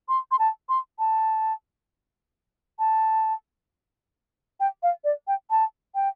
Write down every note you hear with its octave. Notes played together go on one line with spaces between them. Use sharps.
C6
C6
A5
C6
A5
A5
G5
F5
D5
G5
A5
G5